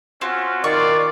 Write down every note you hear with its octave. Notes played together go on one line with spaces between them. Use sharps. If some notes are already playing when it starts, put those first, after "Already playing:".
C4 C#4 F4 F#4
D#3 F4 D5 C#6